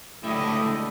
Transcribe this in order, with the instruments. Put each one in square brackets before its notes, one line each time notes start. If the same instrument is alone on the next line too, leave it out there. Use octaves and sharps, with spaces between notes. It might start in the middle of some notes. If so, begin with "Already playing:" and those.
[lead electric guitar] C#2 A3 [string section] D3 [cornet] E4 [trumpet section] G4 D#5